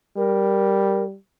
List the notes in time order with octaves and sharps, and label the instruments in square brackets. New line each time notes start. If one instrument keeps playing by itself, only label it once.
[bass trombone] G3 [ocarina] A#4